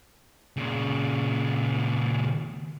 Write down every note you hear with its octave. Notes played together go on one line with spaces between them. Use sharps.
A#2 C#3